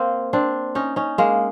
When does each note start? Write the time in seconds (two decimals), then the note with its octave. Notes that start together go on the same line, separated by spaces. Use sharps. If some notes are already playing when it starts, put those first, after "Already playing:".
Already playing: A#3 C4
0.33 C4 D4
0.75 C#4 D#4
0.96 C#4 D#4
1.18 G#3 A#3